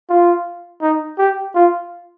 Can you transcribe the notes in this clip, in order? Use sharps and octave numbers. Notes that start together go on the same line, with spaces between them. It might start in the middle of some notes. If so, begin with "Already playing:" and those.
F4
D#4
G4
F4